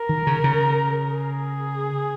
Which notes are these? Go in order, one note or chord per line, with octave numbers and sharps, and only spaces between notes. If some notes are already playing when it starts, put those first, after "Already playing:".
Already playing: A#4
D#3
C#3
C#3
G#4